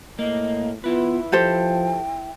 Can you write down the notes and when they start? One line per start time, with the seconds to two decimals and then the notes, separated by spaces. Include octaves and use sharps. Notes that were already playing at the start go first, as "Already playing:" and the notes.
0.19 A2 A#3 D#5
0.84 B3 E4 F4 B4
1.32 F3 G4 A4 C5 G5